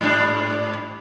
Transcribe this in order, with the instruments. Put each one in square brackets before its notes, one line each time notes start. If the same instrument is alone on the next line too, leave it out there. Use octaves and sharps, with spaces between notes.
[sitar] G#2 G3 D4